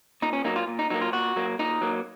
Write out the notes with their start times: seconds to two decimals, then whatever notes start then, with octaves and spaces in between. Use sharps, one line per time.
0.22 A#2 D#4
0.33 C#4
0.45 F#3 A#3 D#4
0.56 F4
0.68 A#2
0.79 D#4
0.90 F#3 A#3 D#4
1.01 F4
1.13 A#2 F#4
1.36 F#3 A#3
1.59 A#2 D#4
1.81 F#3 A#3